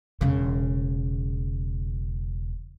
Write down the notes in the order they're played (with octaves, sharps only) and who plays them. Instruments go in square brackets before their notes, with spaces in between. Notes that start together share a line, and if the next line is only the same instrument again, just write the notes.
[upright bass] E1 C#3